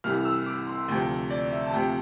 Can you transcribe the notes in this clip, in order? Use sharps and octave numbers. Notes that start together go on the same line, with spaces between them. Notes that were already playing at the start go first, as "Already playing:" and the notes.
C2 C3 E3 F6
E6
D6
C6
D2 C3 F3 G5
D5
E5
A5
D2 C3 F3 G5